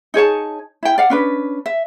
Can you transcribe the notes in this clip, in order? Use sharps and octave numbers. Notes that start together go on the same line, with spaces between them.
D#4 G#4 C#5 A5
E4 G5
D5 F5 F#5
C#4 D4 B4
E5